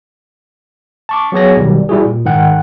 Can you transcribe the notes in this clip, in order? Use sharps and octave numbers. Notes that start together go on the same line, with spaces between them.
A5 C#6 D6
F#3 B3 G#4 C#5 A#6
B1 B2 D#3 G3
G3 E4 F#4 G#4
A#2
G#2 D#3 F#5 G5 F#6